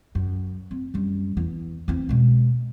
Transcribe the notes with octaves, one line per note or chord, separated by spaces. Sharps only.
F#2
C4
F#2 G3
E2
E2 C4
B2 G#3